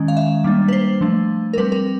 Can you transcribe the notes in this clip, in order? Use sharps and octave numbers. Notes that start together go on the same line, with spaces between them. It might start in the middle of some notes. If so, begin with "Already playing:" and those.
Already playing: D#3 G#3 C#4
F5
E5
G3 A#3 D4
B4
C5
F3 A3 D4
A#4
G3 C4 B4
A#4